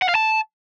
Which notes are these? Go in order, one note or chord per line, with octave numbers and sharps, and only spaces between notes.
F#5
F5
A5